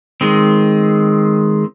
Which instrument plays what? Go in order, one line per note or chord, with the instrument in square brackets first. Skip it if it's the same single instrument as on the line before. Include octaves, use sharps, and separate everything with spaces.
[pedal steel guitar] D#3 G#3 C4